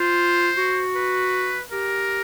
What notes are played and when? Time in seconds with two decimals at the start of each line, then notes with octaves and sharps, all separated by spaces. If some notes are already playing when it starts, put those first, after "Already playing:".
Already playing: F4 C5
0.57 F#4
0.96 B4
1.71 G4 A#4